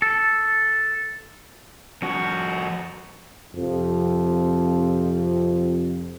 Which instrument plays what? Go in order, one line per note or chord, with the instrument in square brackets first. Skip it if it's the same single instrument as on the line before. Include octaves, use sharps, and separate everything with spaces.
[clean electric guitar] A4
[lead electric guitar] F2 F#4
[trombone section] F2 C3 F3